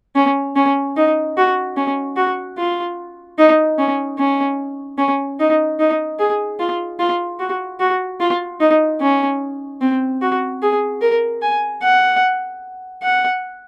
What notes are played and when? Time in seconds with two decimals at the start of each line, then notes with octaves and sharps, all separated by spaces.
0.16 C#4
0.56 C#4
0.97 D#4
1.37 F#4
1.77 C#4
2.17 F#4
2.58 F4
3.38 D#4
3.79 C#4
4.19 C#4
4.98 C#4
5.40 D#4
5.80 D#4
6.19 G#4
6.60 F4
6.99 F4
7.40 F#4
7.80 F#4
8.20 F4
8.61 D#4
9.01 C#4
9.81 C4
10.22 F#4
10.62 G#4
11.02 A#4
11.42 G#5
11.83 F#5
13.03 F#5